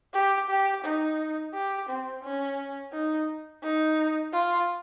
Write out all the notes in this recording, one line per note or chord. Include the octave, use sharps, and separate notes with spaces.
G4
G4
D#4
G4
C4
C#4
D#4
D#4
F4